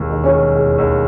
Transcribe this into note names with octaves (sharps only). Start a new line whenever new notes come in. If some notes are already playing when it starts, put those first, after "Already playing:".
Already playing: E1 D#2
D#3
C#4
E1
E1
D#2